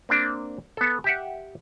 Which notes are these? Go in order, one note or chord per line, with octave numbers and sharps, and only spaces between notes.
A#3 C4 D4
B3 A4
G4 E5 F#5